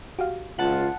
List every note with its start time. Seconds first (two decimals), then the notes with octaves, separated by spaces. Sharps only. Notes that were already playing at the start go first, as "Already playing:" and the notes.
0.19 F#4 G4 F5
0.59 C#2 F4 F#5 A5